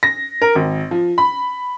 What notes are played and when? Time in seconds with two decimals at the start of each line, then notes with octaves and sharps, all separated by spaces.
0.03 A#6
0.42 A#4
0.55 G#1
0.91 F3
1.18 B5